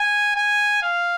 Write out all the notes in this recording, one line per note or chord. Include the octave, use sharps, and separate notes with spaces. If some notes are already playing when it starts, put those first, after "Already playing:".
Already playing: G#5
G#5
F5